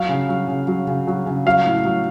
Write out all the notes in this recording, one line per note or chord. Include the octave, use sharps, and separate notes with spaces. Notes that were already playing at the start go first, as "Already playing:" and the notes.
Already playing: F#3 F5
C#3
F#3
C#3
F#3
C#3
F#3
C#3
F#3 F5
A2
F#3